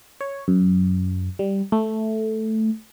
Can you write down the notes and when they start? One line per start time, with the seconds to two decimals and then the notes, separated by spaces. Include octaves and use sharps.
0.21 C#5
0.48 F#2
1.39 G3
1.72 A3